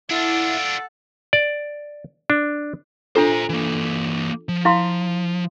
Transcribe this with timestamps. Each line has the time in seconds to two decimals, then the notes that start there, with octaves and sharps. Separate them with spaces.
0.10 D4 E4 F4 A4 F#5
1.33 D5
2.30 D4
3.16 D4 F4 A4 C5 A#5
3.50 E3 A#3
4.49 F3
4.65 E4 F5 C6